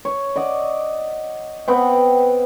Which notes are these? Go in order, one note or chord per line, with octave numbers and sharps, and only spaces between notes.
C#5
D5 D#5 F#5
B3 C4 F#5 G5